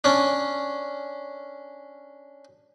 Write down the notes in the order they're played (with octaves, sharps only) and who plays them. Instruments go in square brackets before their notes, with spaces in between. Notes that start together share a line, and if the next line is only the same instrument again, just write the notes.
[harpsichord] C#4 D4